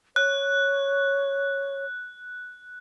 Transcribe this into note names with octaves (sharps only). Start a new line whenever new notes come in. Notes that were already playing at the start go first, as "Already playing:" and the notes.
C#5 F#6